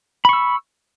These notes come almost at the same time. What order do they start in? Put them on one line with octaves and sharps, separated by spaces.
B5 C#6 E6